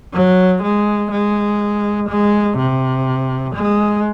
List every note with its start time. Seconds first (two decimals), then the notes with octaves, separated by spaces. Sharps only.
0.14 F#3
0.63 G#3
1.11 G#3
2.09 G#3
2.58 C3
3.55 G#3